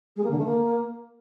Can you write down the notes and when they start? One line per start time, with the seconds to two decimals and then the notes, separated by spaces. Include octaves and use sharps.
0.16 G#3
0.23 A#3
0.30 D3
0.38 A3
0.45 A#3